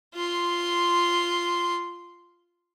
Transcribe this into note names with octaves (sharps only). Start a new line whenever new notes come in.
F4 C6